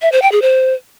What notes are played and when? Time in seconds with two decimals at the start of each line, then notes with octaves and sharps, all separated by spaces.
0.02 E5
0.12 C5
0.22 G5
0.32 G#4
0.42 C5